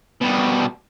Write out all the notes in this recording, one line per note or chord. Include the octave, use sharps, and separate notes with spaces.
B2 G3